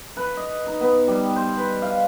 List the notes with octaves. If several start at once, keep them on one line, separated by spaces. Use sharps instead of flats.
B4
D#5
D#4
B3
G3
C5
B4
F5